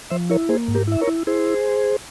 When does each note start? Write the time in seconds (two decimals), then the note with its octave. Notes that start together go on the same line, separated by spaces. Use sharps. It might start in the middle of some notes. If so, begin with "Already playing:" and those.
0.10 F3 C5 E5
0.30 E4 A#4 C#5
0.49 A#3 G#4 C5
0.68 G#2
0.75 G4 A#4
0.87 E4 E5
1.01 A#4 C#5
1.07 E4
1.27 E4 G#4 C5